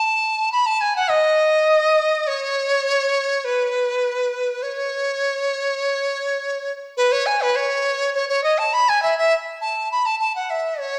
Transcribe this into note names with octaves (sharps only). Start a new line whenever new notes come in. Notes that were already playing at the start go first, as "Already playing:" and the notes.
Already playing: A5
B5
A5
G#5
F#5
D#5
C#5
B4
C#5
B4
C#5
G#5
B4
C#5
C#5
C#5
D#5
A5
B5
G#5
E5
E5
A5
B5
A5
A5
F#5
E5
C#5